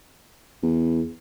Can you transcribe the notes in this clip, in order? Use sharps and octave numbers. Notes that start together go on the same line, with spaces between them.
E2